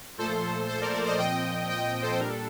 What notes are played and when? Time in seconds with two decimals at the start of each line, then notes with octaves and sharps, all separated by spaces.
0.18 A#2 F3 A3 A4 C5
0.68 A4 C5
0.81 A#4 D5
0.93 A#4 D5
1.06 C5 D#5
1.18 A#2 F3 C4 D#5 G5
1.69 D#5 G5
1.85 D#5 G5
2.02 A4 C5
2.19 A#2 G3 D4 A#4
2.29 A4